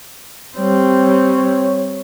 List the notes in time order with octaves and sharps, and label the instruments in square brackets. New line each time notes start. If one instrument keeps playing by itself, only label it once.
[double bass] G3 C4 [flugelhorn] C#5